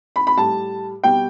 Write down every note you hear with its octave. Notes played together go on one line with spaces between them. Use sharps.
B5
B5
A2 G3 A5
B2 G3 G5